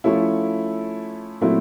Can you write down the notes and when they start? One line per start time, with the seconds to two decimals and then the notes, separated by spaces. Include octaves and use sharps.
0.04 F3 A3 C#4 E4
1.41 A#2 F#3 A3 C4 E4